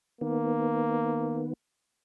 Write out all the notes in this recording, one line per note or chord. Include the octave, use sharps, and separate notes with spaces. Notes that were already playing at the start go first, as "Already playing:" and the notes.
D#3 A#3 B3